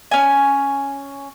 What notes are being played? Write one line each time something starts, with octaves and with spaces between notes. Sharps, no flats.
C#4 G#5